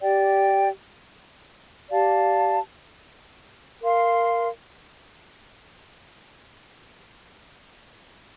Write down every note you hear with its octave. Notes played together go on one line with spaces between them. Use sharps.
G4 D5 G5
G4 D5 F5 A5
A#4 F5 C6